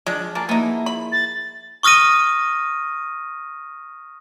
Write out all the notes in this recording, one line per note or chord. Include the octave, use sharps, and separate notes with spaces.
F3 G#3 D4
A#3 G#4 G#5 A5
A#3 B3 D#4 E4
B5
A6
C#6 D#6 F6 A#6 D#7